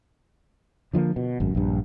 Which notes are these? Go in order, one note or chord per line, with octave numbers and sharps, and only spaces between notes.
D3 F3 G3 A#3
B2
G#1 F#2
A#1 G2